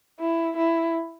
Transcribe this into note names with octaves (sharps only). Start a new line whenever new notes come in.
E4
E4